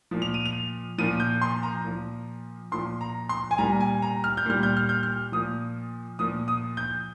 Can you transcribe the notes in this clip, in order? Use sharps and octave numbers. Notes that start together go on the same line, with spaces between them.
A#2 F3
F7
D#7
F7
A#2 F3 D#7
G6
C6
A#5
A#2 F3
A#2 F3 C6
A#5
C6
G#5
A#2 G3 A#5
G#5
A#5
F6
G6
A#2 G3 F6
G6
F6
G6
F6
A#2 F3 D#6
A#2 F3 D#6
D#6
G6